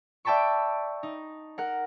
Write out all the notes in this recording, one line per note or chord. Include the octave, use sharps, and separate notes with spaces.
D5 E5 G5 A5 B5 C#6
D#4
A#4 F#5